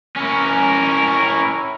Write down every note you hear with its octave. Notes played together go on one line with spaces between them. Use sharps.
C#4 E4 A#4